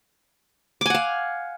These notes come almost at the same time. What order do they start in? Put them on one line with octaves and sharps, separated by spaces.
D6 G#5 F#5 F5